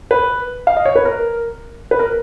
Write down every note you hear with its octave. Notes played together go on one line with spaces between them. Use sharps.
B4
F5
D#5
C#5
B4
A#4
B4
A#4